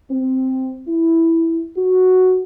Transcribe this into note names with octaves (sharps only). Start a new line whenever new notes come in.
C4
E4
F#4